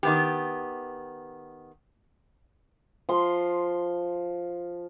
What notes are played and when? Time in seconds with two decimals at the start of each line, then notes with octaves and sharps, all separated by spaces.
0.03 D#3 B3 G4
3.09 F3 C6